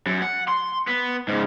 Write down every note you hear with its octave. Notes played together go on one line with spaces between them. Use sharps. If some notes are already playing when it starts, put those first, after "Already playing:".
F#2
F#5
C6
B3
G#2 C#3